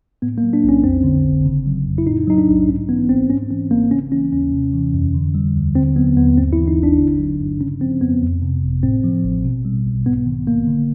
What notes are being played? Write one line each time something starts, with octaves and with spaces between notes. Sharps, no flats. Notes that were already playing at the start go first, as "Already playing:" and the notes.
A2 B3
A#3
F#3
D4
B1
C#4
F2 C4
D3
G1
C#3
F#3
F2
E4
A2 D#4
F#3 D#4
D4
B1
G#2 C#4
E3 B3
G#1 C4
G#2 C#4
E3 C4
G#1 A#3
C#3 C#4
E3 C#4
D#2 C#4
C3
E3
F2
D3
G3
D#2
D3 C4
F#3 B3
D#2 B3
G2 C4
E4
E3
D#4
G1
D4
D3
F#3
G2
C#3 C#4
F3 C4
F2 B3
F2
C3
G1
A2 C4
F3
A1
B2
G3
B1
G#2 B3
D#3
A1 A#3
D3